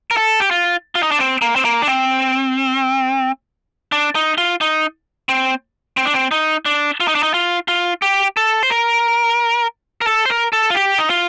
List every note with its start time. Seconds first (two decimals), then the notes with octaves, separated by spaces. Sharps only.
0.11 A#4
0.17 A4
0.40 G4
0.51 F4
0.95 F4
1.03 D#4
1.12 D4
1.19 C4
1.42 A#3
1.56 C4
1.65 A#3
1.82 D4
1.88 C4
3.92 D4
4.15 D#4
4.38 F4
4.61 D#4
5.29 C4
5.97 C4
6.05 D4
6.14 C4
6.31 D#4
6.66 D4
7.00 F4
7.08 D#4
7.15 D4
7.23 D#4
7.34 F4
7.68 F4
8.02 G4
8.37 A4
8.63 C5
8.70 A#4
10.01 A#4
10.07 A4
10.25 C5
10.30 A#4
10.53 A4
10.70 F4
10.75 G4
10.98 D#4
11.10 F4